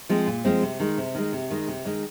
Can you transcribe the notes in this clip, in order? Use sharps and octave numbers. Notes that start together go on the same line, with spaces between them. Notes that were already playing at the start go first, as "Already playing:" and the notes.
F3 G#3 C4
A#2
F3 G#3 C4
C3
D#3 G#3
C3
D#3 G#3
C3
D#3 G#3
C3
D#3 G#3